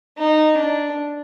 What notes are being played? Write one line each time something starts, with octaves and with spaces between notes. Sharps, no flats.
D#4
D4